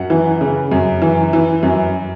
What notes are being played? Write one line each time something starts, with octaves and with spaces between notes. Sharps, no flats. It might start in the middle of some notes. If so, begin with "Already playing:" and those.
Already playing: F#2 F#5
E3
C#3
F#2
E3
E3
F#2